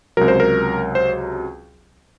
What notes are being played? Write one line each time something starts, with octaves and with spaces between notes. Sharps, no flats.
C#2 C3 F#3 A#4
C5
A#4
C5